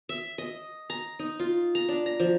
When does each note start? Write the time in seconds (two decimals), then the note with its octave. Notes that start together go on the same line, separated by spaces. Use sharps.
0.09 E5
0.38 D#5
0.90 A#5
1.19 D#4
1.40 F4
1.75 A#5
1.89 D4
2.06 A#5
2.20 F3